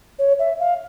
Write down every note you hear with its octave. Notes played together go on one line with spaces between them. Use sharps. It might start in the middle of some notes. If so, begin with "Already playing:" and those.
C#5
E5
F5